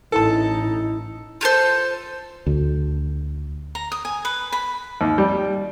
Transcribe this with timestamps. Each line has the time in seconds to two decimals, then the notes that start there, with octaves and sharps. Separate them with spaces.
0.12 A1 D#4 E4 A4 A5
1.41 F4 G4 A4 C5
2.46 D2
3.75 A#5
3.92 D#6
4.05 G#5
4.25 B4
4.52 B5
5.01 D#2
5.18 G3